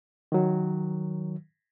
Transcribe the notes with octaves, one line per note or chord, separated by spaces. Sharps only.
D#3 F#3